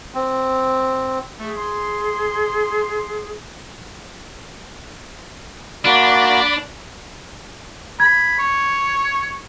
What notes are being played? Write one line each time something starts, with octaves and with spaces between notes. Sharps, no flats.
C4
A3 G#4
C6
A#3 D4 F#4 D5 B5
B5 G#6
C#5